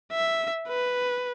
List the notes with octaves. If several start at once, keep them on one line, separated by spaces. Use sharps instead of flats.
E5
B4